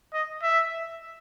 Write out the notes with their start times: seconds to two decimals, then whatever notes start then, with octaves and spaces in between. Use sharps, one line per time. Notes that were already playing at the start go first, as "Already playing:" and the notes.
0.13 D#5
0.42 E5